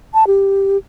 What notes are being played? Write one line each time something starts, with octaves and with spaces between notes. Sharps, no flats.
A5
G4